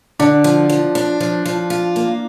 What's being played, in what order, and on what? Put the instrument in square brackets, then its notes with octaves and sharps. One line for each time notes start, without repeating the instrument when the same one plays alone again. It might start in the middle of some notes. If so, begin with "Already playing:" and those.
[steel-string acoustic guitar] D3 [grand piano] D4
[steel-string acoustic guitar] F3
F3
D4
F3
F3
F4
A#3